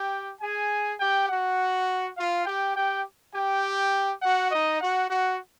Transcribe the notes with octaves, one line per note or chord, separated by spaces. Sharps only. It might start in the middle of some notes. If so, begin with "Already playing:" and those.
Already playing: G4 G5
G#4 G#5
G4 G5
F#4 F#5
F4 F5
G4 G5
G4 G5
G4 G5
F#4 F#5
D#4 D#5
F#4 F#5
F#4 F#5